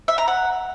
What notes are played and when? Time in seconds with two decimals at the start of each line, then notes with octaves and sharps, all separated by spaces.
0.08 E5
0.18 A#5
0.28 F#5